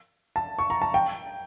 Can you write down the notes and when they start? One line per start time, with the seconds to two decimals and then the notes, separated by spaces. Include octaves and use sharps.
0.36 A5
0.59 C#6
0.70 A#5
0.82 A5
0.94 G5